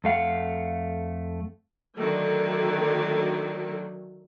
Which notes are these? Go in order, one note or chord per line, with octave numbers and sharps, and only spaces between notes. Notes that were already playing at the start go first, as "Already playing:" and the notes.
F2 A3 F5 F#5
D3 D#3 F#3 A3